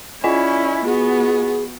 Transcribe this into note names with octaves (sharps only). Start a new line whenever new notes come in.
C#4 E4 F4 D5 D#5 G#5
B3 F#4 G#4